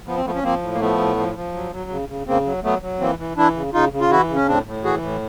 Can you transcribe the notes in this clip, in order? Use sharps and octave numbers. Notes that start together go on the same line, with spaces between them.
F3 B3
C4
F3 A3 B3
C#4
F3 A#3 C4
A2
A#3
F3 A3 B3
A2
F3
F3
F#3
F#3
C#3
C#3
C#3 A#3 C4
F#3
F#3 A3 B3
F#3
E3 A#3 C4
E3
E3 D4 E4
C#3
C#3 D#4 F4
C#3
F4
E3 E4 F#4
C#3
C#4
A2 C4 D4
A2
E3 F#4 G#4
A2